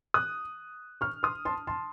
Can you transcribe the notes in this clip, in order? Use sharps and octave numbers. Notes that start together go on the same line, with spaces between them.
D#6 F#6
C#6 F6
C6 D#6
A5 C6
A5 C6